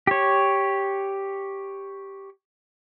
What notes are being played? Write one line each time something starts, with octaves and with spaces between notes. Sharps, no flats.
G4 C#5